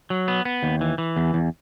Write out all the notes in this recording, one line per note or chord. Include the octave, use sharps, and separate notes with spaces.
F#3
B3
B3
D#2
E3
E3
E2
E2